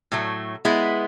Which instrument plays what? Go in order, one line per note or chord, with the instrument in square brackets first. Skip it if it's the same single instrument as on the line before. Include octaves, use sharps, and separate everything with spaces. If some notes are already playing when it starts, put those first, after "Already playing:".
[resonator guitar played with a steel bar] A2 F#3 A3
G#3 B3 E4